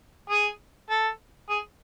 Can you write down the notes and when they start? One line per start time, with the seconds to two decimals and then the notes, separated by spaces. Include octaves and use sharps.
0.30 G#4
0.90 A4
1.50 G#4